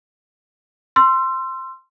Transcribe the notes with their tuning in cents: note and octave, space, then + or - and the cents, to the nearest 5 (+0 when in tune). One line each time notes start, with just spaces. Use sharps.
C6 +0 E6 +35